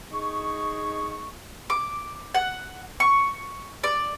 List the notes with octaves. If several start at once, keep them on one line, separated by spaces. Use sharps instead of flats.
D#4 G#4 C#6
D6
F#5
C#6
D5